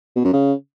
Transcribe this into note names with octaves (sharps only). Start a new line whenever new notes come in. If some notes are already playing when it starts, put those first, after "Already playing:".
B2
F#2
C#3